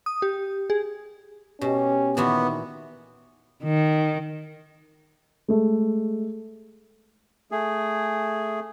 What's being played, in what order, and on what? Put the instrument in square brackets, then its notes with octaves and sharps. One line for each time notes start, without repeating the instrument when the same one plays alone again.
[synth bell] D#6
G4
G#4
[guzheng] B2 [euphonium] C#4 [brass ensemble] G4
[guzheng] A#2 E3 F#4 [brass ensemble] D#3 [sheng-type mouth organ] B3
[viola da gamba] D#3
[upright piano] G#3 A3
[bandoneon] A3 G#4